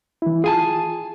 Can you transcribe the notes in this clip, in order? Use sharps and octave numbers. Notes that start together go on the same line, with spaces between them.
E3 E4
F4 G#4 G#5 A5